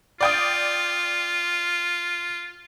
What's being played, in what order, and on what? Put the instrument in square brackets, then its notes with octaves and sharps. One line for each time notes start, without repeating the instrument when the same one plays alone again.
[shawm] F4 [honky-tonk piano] D5 G5 D#6